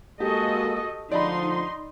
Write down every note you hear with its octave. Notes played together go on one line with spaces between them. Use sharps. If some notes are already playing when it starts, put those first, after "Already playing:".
G#3 A#3 F#4 G4 A4 D#5
D3 F3 D#4 D5 D#5 B5 C6